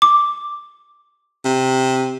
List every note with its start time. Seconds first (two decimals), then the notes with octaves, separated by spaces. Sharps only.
0.02 D6
1.45 C3